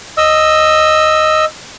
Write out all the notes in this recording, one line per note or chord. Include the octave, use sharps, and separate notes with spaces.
D#5 E6